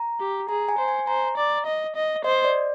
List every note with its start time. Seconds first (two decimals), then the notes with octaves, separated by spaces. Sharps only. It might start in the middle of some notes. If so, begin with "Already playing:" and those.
Already playing: A#5
0.20 G4
0.49 G#4 A#5
0.69 G#5
0.79 C5
0.88 G#5
1.07 C5 A#5
1.37 D5
1.66 D#5
1.96 D#5
2.24 C5 D#5
2.45 D5